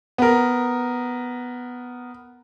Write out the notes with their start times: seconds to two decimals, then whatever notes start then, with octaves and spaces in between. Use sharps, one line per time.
0.18 B3 A#4